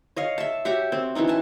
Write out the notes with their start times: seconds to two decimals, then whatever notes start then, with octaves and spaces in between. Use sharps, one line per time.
0.17 C#5 D#5 F5
0.38 E5 A5
0.65 F#4 G4 C#5 E5
0.92 C4
1.15 E3 F#3 C#4 D#4
1.28 E5 G#5 A5